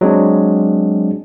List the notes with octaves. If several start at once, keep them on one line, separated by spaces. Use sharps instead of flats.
F#3 G#3 C4 D4